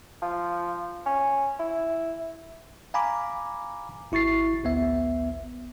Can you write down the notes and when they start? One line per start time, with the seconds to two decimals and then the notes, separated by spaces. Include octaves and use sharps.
0.22 F3
1.06 C#4
1.59 E4
2.94 F5 G#5 A#5 B5 D6
4.12 G#1 E4 C#6 A6 C7
4.63 A1 D2 B3 E5